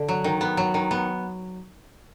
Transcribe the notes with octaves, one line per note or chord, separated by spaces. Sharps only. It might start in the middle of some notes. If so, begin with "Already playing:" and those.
Already playing: D3
F#3
D#3
B3
F#3
D#3
B3